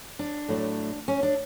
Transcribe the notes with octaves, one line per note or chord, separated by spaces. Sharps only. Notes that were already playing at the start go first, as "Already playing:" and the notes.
D4
A2 F#3 A3
C#4
D4